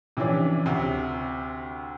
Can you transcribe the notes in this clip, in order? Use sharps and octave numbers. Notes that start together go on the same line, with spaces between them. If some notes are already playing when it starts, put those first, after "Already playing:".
C3 E3 F3 C#4 D4
D2 C3